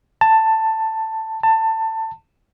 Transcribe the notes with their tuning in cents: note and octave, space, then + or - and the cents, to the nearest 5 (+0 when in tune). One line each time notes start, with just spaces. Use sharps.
A5 +10
A5 +20